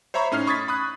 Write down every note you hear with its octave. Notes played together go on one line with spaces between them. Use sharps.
C5 C#5 E5 A#5 B5 C#6
A2 C#4 D#4 F6 C7
B5 C#6 D#6 G#6 A6 B6
B5 D#6 F#6